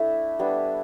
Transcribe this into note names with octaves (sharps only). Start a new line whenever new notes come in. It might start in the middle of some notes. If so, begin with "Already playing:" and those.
Already playing: A3 D4 E4
G3 B3 D4